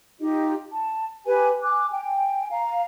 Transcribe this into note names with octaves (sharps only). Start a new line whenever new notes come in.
D#4 F4 G4 D#5
A5
G4 B4 G#5
G#5 D6 F#6
G5 G#5
F5 A#5